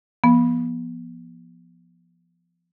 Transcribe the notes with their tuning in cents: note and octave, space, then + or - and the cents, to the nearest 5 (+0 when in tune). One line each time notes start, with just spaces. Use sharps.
F3 -20 B3 -30